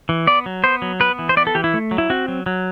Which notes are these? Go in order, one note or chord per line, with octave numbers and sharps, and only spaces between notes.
E3
B3 D5
F#3
B3 C5
F#3
B3 B4
E3
C5
B3 D5
A4
E3 G4
E4
A3
F#3
E4
C4 F#4
F#3
F#3